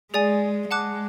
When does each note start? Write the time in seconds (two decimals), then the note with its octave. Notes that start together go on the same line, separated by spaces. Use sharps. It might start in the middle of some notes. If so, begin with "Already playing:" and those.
0.14 G#3 G#4 D5 G#5
0.70 G#3 F#5 A5 D6 F#6